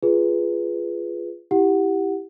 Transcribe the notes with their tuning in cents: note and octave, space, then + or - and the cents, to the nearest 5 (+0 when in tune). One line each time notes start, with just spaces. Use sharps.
F4 -10 G#4 +0 B4 +0
E4 +0 G4 +0 F#5 +0